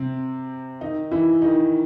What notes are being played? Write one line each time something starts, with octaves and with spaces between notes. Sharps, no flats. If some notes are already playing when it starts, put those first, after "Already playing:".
Already playing: C3 C4
D#3 D#4
E3 E4
D#3 D#4